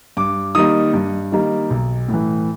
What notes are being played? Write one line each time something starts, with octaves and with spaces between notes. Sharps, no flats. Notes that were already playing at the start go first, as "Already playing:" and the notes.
G2 D6
D#3 G3 A#3 D#4 D#6
G2
D#3 G3 A#3 D#4
B1
A2
E3